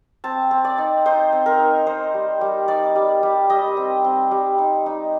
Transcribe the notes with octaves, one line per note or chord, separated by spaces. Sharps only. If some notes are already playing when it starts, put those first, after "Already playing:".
C4 A5
C4
D5
D#4
D#4 C5
C4
A#4
D#4
D#4 C5
G3
G3
D#4 D5
G3
G3
G3 D#5
C4
C4
G3
D#4
D#4